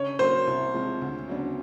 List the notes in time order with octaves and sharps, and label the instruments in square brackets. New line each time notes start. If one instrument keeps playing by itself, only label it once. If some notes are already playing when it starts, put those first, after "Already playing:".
Already playing: [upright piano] C#3 [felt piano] C#5
[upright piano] F#3 A#3 [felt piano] C5
[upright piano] C2
C3 F3 G#3
D2
C#3 F#3 B3 D4